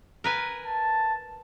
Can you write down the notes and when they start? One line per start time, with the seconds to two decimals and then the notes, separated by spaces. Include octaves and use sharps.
0.24 A#4 B4 G#5
0.66 A5